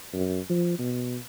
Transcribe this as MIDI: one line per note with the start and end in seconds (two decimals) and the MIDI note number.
0.14 0.40 42
0.49 0.77 53
0.79 1.17 47